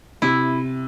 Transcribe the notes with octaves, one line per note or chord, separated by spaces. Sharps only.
C3 E4